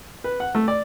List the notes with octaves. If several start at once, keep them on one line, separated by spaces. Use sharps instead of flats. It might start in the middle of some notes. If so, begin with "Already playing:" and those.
B4
F#5
A3
D5